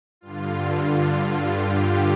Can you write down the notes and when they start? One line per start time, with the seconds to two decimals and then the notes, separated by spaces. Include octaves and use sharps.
0.21 G2 D3 F4
0.62 F4
1.46 G4